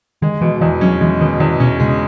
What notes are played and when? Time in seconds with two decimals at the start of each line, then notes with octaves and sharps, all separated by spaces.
0.22 D#3 G#3
0.41 B2 E3
0.61 E2 E3
0.81 F#3 C#4
1.01 E3 G#3
1.21 B2 D#3
1.40 E2 D#3
1.60 B2 C#4
1.80 C#3 G#3